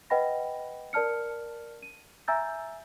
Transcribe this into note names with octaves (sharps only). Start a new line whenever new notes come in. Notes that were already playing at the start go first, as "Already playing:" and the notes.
B4 D#5 F#5 G5 B5 A#6
A#4 D5 A5 F6 C#7
D#7
E5 G#5 A#5 E6 G6 A6